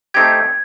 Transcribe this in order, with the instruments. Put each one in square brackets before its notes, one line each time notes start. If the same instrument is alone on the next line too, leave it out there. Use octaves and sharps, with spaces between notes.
[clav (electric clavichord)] A3 C4 D#4 G4 [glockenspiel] G#6